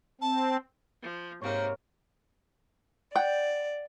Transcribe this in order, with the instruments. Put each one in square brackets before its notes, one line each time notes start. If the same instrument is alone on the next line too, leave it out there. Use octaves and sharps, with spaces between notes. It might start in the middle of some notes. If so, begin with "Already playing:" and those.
[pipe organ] C4 [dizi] A5
[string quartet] F3
[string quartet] G#2 C3 A#3 [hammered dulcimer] A#4 C#5
[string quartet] D5 [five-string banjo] F#5 G5